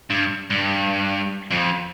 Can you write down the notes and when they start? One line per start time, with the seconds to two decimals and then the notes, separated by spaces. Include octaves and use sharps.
0.10 G2
0.50 G2
1.51 F2